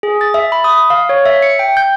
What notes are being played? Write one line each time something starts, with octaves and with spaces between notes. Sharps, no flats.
G#4
A6
E5
B5
D#6
F5
C#5
E5
C#7
G5
G6